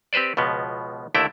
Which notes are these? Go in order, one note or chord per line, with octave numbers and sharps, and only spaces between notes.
C4 G4 B4 C5 D5
C#2 B2 F3 B3
D#2 D3 A3 E4 E5 G5